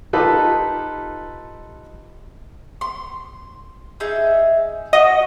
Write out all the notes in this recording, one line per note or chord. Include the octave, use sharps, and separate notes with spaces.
D#4 F4 G4 A4 B4
C6
D#4 G#4 E5
F#4 D#5